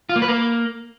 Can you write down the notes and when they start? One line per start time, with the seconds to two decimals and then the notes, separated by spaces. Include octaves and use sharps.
0.09 F4
0.16 A#3
0.22 B4
0.28 A#3